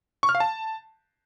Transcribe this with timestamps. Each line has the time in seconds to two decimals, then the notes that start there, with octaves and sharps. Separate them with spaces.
0.23 C#6
0.29 F6
0.35 F5
0.40 A5